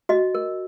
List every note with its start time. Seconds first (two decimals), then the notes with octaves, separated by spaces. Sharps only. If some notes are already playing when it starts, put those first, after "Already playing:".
0.09 F#4 D#5
0.35 A#4